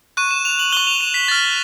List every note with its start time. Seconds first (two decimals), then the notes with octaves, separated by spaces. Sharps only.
0.17 C#6 F#6 D#7
0.31 E7
0.45 F7
0.59 F#7
0.72 C#6 F#6 G7
0.87 F7
1.01 E7
1.14 B6
1.28 C#6 F6 A6